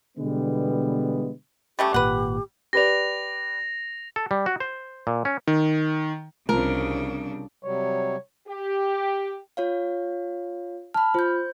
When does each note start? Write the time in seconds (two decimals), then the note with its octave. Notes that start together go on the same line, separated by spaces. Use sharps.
0.17 B2 D3 E3 G3 G#3 B3
1.79 G3 A3 C#4 G4
1.94 G#1 A#2 B4 F#5
2.73 G4 B4 D5 A#6 F7
4.16 A4
4.31 G3
4.46 F#4
4.60 C5
5.07 A#2
5.25 C#4
5.47 D#3
6.49 C2 C#3 F3 C4 D4 A#4
7.64 C3 F#3 G3 C#5
8.49 G4
9.57 F4 C#5 F5
10.94 A5 B5 F6
11.14 F4 C5 G6